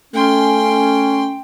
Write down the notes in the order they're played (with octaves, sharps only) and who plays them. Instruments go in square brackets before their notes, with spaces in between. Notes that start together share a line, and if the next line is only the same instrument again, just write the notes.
[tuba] A3 [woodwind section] C#4 [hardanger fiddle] G5 C6